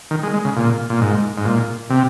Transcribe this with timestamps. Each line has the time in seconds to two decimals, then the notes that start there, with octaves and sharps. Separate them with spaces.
0.11 D#3
0.23 G#3
0.34 G#3
0.45 C#3
0.56 A#2
0.90 A#2
1.01 G#2
1.38 G#2
1.45 A#2
1.90 C3